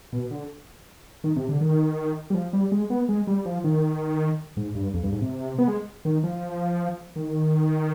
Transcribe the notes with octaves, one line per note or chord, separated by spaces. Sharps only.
B2
D3
D#3
C3
D3
D#3
G3
F3
G3
G#3
B3
G#3
G3
F3
D#3
G#2
G2
F2
G2
G#2
C3
B3
G#3
D#3
F3
D#3